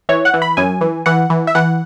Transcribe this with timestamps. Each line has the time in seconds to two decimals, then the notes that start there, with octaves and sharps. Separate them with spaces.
0.09 E3 C#5
0.25 F#5
0.34 E3
0.42 B5
0.57 F#2 G#5
0.81 E3
1.06 E3 F#5
1.30 E3
1.47 E5
1.55 E3 F#5